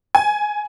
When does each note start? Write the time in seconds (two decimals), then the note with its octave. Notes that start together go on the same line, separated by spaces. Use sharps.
0.15 G#5